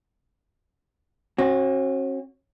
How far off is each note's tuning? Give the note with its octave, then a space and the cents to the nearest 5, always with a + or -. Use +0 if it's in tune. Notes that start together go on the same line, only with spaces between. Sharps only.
C#4 -45 F#4 +0